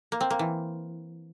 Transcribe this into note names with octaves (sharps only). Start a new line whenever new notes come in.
A#3
C4
A#3
E3